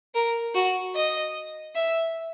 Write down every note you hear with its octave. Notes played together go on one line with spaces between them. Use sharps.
A#4
F#4
D#5
E5